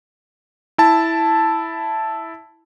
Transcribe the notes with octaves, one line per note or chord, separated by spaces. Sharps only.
E4 A5